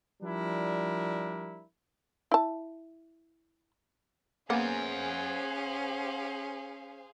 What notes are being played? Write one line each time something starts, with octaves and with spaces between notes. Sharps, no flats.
F3 G3 D4 E4 A#4
E4 A5
A#3 B3 C#4 G#4 C5 F5 F#5 G#5